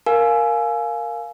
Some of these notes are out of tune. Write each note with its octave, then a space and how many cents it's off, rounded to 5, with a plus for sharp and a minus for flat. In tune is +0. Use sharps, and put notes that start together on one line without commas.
A#4 +0 F5 +0 G#5 +20